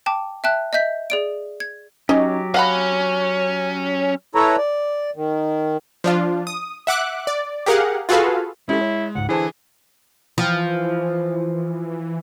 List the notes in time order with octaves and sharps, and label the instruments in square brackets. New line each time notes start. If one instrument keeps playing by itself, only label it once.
[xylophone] G5 A5 D6
E5 G5 A5 F#6
D#5 E5 G6 B6
G#4 D5 D7
G#6
[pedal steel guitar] F#3 G4 [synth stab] C#4 D#4 [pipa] D#5
[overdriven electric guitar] C#4 [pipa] F5 F#5 B5 [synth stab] F#6 A#6
[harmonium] E4 A4 B4 C#5 A#5
D5
D#3
[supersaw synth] F3 D4 F4
D#6
E5 F#5 D6 F#6
D5
G4 G#4 A#4 F5 F#5
F4 F#4 G#4 A4 B4 F5
[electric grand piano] G#3 [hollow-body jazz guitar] C#4 G4 A4 [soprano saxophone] E4
[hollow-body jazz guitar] C#5
[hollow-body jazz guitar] C#2 G#2 [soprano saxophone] F#5
[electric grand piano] D3 E3 [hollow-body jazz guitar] E4 C5 A5 [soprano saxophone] G#4
[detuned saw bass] E3 [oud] F3